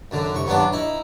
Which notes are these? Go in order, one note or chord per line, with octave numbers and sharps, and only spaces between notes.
F#2 D3
C2 C#6
G2 F#3 B3 D4
D#4 E4